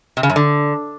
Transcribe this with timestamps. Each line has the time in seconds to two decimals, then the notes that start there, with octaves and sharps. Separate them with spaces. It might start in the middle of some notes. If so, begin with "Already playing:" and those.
0.17 C3
0.23 C#3
0.30 F#2
0.36 D3